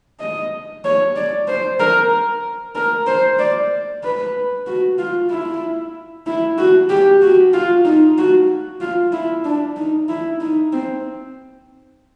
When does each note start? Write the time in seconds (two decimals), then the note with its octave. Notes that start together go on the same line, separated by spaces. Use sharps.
0.20 D#5
0.85 C#5
1.16 D5
1.48 C5
1.80 A#4
2.75 A#4
3.07 C5
3.39 D5
4.04 B4
4.67 F#4
4.99 F4
5.30 E4
6.26 E4
6.58 F#4
6.90 G4
7.22 F#4
7.54 F4
7.85 D#4
8.18 F#4
8.81 F4
9.13 E4
9.45 D4
9.76 D#4
10.09 E4
10.41 D#4
10.73 C4